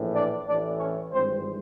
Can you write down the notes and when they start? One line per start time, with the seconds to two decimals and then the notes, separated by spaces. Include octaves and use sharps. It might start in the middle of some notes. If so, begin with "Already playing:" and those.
Already playing: A#1 A2 E3
0.14 D4 D5
0.46 A1 A2 E3 D4 D5
0.78 C#4 C#5
1.12 G#1 G2 E3 C4 C5